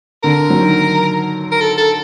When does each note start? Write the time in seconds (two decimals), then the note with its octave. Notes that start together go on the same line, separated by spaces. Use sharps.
0.23 D3 A#4
0.50 F#3
0.58 D#3
1.52 A#4
1.61 A4
1.78 A4